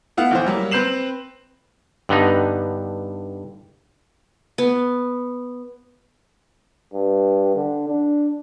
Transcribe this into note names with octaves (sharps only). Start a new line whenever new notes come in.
A3 B3 E4 F5 F#5
A#1 E3 C5
F#3 G3 A#3
C4 B4 G6 C7 E7 F#7
G2 D3 B3 D#4
B3
G2
D3
D4